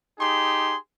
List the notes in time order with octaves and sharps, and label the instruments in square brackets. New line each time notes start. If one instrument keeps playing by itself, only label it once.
[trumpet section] D#4 G4 G#4 C6